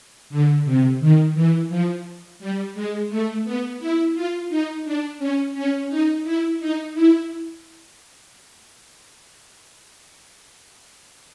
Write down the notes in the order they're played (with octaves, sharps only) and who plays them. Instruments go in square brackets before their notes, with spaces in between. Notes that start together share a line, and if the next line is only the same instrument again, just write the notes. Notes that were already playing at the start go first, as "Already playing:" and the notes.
[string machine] D3
C3
D#3
E3
F3
G3
G#3
A3
B3
E4
F4
D#4
D4
C#4
C#4
D#4
E4
D#4
E4